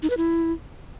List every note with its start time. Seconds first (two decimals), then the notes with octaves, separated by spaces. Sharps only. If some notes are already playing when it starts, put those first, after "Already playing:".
0.03 D#4
0.10 B4
0.17 E4